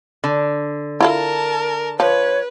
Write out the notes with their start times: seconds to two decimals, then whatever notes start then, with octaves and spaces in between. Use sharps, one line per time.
0.24 D3
1.00 E4 F4 A4 A#4 A5
2.00 F3 B4 C#5